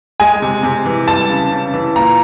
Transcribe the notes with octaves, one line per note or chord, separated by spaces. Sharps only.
G#3 G#5
C3
C3
E3
G3 A5
C#3
C#3
E3
A#2 A#5